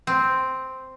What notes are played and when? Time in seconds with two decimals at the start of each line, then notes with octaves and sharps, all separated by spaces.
0.07 C4